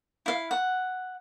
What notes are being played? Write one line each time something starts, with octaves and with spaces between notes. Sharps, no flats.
E4 F5
F#5